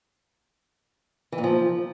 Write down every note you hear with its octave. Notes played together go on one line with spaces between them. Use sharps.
E3
A#2
F3